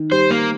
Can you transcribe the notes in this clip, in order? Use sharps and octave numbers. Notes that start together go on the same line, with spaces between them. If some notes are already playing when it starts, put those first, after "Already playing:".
Already playing: D#3
G3 C5
A#3